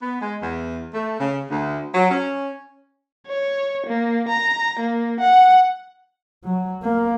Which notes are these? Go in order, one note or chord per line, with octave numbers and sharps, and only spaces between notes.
B3
G#3
E2
A3
C#3
D2
F#3
C#4
C#5
A#3
A#5
A#3
F#5
F#3
A#3